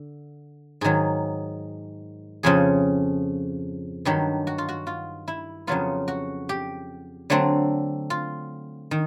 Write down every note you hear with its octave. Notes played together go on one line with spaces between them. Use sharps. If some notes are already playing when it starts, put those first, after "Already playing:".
Already playing: D3
G#2 D#3 F#3 G#4
F2 C#3 F3 G#4
G2 D#3 F#3 G4
F#4
F4
F#4
F4
E4
F2 C#3 F#3 B3 F4
F#4
G4
D3 F#3 A3 C4
F4
D#3